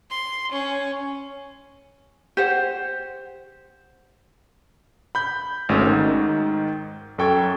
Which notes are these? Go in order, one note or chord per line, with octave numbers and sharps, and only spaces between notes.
C6
C#4
G4 C5 F#5
B5 G6
G#1 A3 C#4 F#4 E6
G#2 D#3
F#2 A4 G5 C#6 G#6